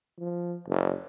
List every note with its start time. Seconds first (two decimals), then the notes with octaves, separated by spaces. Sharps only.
0.19 F3
0.69 F#1